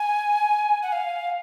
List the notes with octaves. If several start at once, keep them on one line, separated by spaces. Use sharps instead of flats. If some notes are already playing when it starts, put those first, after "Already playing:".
Already playing: G#5
F#5
F5